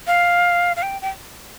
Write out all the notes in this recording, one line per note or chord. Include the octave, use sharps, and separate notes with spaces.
F5
F5
G5
G5